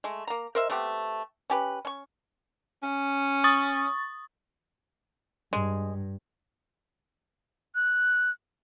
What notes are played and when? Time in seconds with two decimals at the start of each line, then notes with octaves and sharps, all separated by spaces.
0.04 G#3 A3
0.27 A#3 A#5
0.55 A#4 C5 D#5 E5
0.70 A3 B3 C4 G4
1.50 C#4 G4 B4
1.85 C#4 C#6
2.83 C#4
3.44 C#6 D#6 A6
5.53 G2 G#3
7.75 F#6